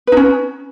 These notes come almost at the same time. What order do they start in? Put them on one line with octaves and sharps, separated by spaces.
B4 D#4 C#4